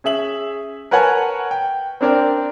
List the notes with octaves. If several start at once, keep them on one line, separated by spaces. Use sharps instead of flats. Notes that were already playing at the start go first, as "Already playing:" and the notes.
C#4 G#4 E5 F#7
A#4 B4 C#5 F#5 G#5 A5
G5
C4 D4 A#4 D5 G5